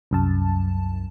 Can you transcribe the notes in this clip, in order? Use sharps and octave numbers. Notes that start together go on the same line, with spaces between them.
C2 F#2 A5